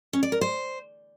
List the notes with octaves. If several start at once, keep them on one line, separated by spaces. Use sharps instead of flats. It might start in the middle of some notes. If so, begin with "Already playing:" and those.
C#4
D5
A#4
C5